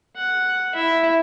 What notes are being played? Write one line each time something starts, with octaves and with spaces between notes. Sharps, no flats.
F#5
E4 E5